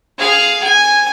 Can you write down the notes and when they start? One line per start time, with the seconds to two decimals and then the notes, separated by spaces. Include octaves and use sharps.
0.18 G#4 F5
0.64 G#5